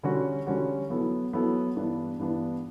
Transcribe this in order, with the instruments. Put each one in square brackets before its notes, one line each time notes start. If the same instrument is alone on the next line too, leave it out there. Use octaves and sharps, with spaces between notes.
[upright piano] D3 G3 C#4 F#4
D3 G3 C#4 F#4
F#3 B3 E4 A4
F#3 B3 E4 A4
G2 E3 B3 D4
G2 E3 B3 D4